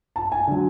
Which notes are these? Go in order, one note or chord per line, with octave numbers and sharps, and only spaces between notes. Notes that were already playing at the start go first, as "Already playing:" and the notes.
A5
G#5
D3 F#3